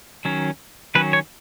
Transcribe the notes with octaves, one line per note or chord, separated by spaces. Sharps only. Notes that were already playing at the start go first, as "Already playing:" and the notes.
D#3 F#3 C#4
D#3 F#3 C#4 B4
C#5